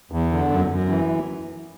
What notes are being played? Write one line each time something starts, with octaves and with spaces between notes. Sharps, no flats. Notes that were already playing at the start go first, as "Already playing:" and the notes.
E2
D3
F#2
F#2
E3